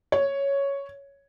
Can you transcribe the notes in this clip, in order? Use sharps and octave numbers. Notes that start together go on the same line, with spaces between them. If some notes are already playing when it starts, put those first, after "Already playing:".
C#5